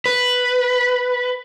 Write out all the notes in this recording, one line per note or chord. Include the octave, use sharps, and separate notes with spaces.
B4